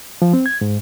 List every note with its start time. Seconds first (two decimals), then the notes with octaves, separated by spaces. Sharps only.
0.22 F3
0.33 C4
0.46 G#6
0.61 G#2